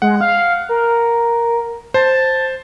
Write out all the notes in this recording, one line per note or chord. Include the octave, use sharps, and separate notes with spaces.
G#3 F#5
F5
A#4
C5 A5